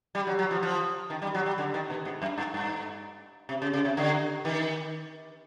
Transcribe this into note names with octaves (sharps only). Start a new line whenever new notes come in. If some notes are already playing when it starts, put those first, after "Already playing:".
G3
F#3
F#3
F3
F3
D#3
G3
F#3
G3
D3
D#3
B2
G#2
F#2
G2
G2
C3
C#3
C#3
C3
D3
D#3